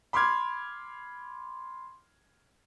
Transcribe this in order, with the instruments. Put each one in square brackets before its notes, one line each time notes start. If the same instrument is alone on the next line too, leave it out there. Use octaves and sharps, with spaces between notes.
[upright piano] B5 C6 D6 F6 G#6